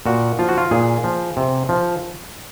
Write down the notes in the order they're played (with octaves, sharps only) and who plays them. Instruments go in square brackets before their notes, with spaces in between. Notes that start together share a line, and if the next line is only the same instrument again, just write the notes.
[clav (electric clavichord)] A#2 F#4
F3 F4
F#4
F4
A#2 G#4
F3
C3
F3